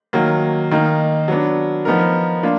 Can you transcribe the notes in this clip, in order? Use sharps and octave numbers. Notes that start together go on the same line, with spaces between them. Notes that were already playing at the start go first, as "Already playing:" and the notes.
D#3 F#3 A#3
D#3 A#3 D#4
F#3 B3 D4
F3 B3 D#4 A#4
A#3 D4 F4